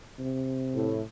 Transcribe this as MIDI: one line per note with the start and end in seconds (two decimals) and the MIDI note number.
0.19 1.03 48
0.73 1.01 45